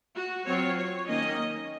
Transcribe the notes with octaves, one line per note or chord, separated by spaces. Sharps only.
F#4
F#3 C4 F4 C#5
C#5
D#3 A#3 C#4 D#5